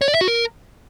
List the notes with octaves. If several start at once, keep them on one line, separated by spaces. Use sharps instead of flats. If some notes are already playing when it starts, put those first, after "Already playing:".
C#5
D5
E5
F#4
A#4